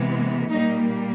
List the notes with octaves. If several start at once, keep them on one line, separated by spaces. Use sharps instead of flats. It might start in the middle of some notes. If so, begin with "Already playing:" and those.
Already playing: C3 E3 G#3 B3
A#2 G3 A#3 D#4